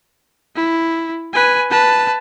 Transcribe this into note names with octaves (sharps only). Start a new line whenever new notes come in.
E4
B4 G#5
B4 A5